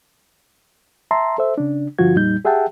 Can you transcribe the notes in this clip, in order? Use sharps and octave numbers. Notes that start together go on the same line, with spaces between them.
E5 A5 A#5 C6
A4 C5 E5
C#3 D4
G2 D3 F3 F4 F#4 G#6
F2 A#2 G3 D#4 G6
G4 G#4 E5 F#5 G5 A5